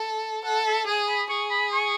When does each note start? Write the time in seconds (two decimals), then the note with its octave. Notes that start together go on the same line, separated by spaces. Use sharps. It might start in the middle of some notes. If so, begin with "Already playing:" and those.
Already playing: A4
0.45 A4 F#5
0.65 E5
0.87 G#4 G#5
1.09 B5
1.30 G#4 C#6
1.51 B5
1.73 C#6